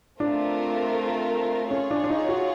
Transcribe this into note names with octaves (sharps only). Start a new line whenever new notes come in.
A3 C4 D4 F4 A#4
C#4 F4 G#4 C#5
D4
D4
D#4
F#4